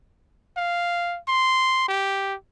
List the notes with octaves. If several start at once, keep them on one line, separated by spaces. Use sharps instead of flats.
F5
C6
G4